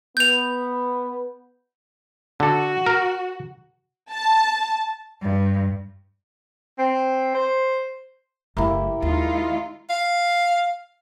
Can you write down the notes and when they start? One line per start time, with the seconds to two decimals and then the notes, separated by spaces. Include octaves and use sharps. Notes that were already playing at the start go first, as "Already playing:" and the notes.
0.17 B3 G6 F7
2.40 D3 F#4 A4
2.86 A#4
4.12 A5
5.22 G2
6.78 C4
7.34 C5
8.57 F#1 A3 A#3 E4 G4
9.02 D#2 G#3 D#4 F4
9.89 F5